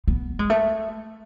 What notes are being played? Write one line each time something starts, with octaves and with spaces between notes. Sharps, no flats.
B3
G#3
A3